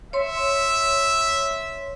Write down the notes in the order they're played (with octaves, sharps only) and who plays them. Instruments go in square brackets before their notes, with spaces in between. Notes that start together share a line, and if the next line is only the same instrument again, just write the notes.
[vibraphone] C#5 C6 [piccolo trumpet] E5